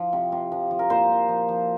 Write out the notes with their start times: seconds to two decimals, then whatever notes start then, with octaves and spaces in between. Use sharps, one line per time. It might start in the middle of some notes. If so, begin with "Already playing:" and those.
Already playing: F3
0.13 C3
0.32 C3
0.52 F3
0.71 F3
0.79 A#4
0.90 A#2 C5
1.09 A#2
1.29 F3
1.49 F3